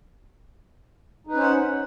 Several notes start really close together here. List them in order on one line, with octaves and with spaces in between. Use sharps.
D#4 B4 C#4 C5 F#5